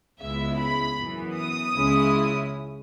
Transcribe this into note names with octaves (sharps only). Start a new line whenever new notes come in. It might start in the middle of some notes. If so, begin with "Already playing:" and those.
C#2 C#3 G#3 B3 E4 E5
B5
F#2 E3 B3
D#6
C#2 C#3 G#3 C#4 E4